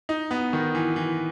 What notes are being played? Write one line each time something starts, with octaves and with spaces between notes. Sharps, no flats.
D#4
B3
D#3
E3
E3